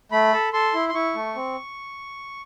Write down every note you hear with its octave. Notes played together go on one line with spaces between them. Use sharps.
A3 B5
A4
A4 C6
E4
C6
E4 C#6
A3
C4